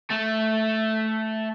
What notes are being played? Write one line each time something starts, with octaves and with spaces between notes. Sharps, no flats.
A3